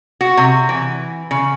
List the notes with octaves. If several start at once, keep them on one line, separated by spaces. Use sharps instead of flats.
F#4
C3
E3
C#3